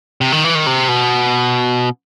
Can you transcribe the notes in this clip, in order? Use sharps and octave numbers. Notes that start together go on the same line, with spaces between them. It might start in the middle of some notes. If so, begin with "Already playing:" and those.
C3
D#3
E3
D#3
C3
B2